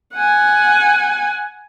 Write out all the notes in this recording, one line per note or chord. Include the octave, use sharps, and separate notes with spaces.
F#5 G#5